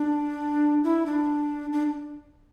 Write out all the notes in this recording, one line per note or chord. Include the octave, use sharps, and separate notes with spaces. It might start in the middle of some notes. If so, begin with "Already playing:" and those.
Already playing: D4
E4
D4
D4